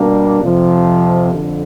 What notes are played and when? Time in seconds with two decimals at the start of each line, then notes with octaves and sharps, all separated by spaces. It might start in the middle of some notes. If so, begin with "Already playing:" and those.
Already playing: B2 G3 A#3 D4
0.42 F2 C3 F3
1.33 F2 D3